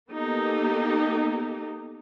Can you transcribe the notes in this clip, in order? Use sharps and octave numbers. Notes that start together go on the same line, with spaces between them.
A#3 B3 D#4 G4 A4